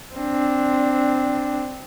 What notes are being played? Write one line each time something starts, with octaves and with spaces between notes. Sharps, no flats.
C4 D4